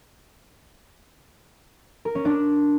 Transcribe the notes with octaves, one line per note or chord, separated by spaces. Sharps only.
A#4
C#4
D4